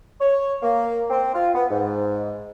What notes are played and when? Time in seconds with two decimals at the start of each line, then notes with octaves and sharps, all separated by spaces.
0.21 C#5
0.62 A#3
1.09 C4
1.33 F4
1.54 B3
1.71 G#2